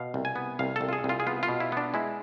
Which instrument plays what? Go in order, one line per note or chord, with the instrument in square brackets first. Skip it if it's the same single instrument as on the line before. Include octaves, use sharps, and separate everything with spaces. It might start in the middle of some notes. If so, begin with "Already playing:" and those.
Already playing: [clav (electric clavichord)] B2 F5
C2
G#5
B3
C2 F5
C2 A4
F4
G#4
C2
F4
G#4
B3 F4
F4
B2
E4
B3 D4
G#3 E4